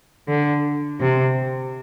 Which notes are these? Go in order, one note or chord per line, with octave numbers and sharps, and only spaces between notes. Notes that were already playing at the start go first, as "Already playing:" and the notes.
D3
C3